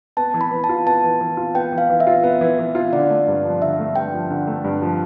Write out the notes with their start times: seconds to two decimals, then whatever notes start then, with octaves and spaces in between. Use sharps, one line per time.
0.17 B3 A5
0.34 E3
0.41 B5
0.51 E3
0.64 A5
0.69 F4
0.86 B3 A5
1.04 E3
1.21 E3
1.37 F4
1.54 B3 G5
1.72 E3
1.78 F5
1.90 E3
2.00 E5
2.07 F4
2.23 B3 E5
2.41 E3
2.59 E3
2.75 F4
2.93 D3 D5
3.10 A3
3.28 G2
3.45 F3
3.62 D3 E5
3.79 A3
3.96 G2 G5
4.14 F3
4.30 D3
4.47 A3
4.64 G2
4.82 F3